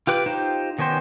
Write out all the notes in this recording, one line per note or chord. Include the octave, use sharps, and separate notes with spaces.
F4 G4 B4 D6
D#4 F4 G4 C5
D#3 B3 C#4 G4 C5